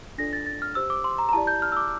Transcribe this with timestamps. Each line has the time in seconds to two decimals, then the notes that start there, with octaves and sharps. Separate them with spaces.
0.18 D4 F4 A4 D5 A#6
0.33 A6
0.46 A6
0.62 F6
0.75 G4 C5 E6
0.90 D6
1.04 C6
1.18 A#5
1.29 A#5
1.33 E4 G4 D5 A5
1.47 G6
1.62 F6
1.72 E6
1.77 D6